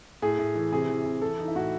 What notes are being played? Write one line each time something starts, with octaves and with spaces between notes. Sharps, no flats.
A2 G#4
A2
E3
C3 G#4
E3
C3
E3 A4
E3 D#4
E4
A2 F#4